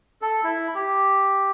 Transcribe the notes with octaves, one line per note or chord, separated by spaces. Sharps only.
A4
E4
G4